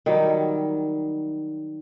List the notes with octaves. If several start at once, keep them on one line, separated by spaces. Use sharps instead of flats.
D#3 F#3 G3